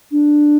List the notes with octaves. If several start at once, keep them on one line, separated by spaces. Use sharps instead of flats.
D4